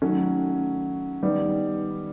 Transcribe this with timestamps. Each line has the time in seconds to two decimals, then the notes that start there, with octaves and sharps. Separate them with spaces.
0.02 D#3 F#3 A3 C#4
1.23 D#3 G3 B3